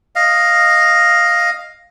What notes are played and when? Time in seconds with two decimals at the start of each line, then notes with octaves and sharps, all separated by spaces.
0.15 D#5 F5